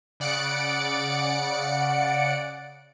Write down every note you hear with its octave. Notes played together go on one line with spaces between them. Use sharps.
C#3 D5 F#5 C#7 D7